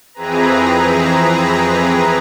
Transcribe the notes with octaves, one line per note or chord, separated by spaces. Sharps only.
F2 E3 C4 G#4 B4 A#5